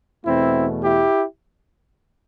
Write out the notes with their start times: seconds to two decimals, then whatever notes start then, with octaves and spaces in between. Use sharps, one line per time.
0.25 E2 B2 A3 C4 E4
0.84 E4 G4